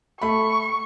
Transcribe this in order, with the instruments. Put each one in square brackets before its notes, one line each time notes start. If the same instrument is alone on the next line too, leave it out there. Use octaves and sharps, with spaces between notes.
[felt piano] A3 B5 [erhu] C#6